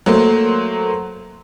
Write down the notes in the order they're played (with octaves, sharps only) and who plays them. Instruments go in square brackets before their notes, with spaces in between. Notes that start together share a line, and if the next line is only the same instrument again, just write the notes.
[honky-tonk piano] F#3 A3 A#3 C5